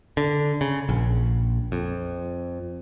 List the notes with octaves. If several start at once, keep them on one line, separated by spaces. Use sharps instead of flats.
D3
C#3
A#1
F2